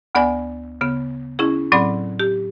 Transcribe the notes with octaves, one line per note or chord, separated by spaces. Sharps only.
D2 B3 D5 G#5
C#3 B3
C#4 E4 G#4
A2 F#3 C4 D5 B5 D6
G4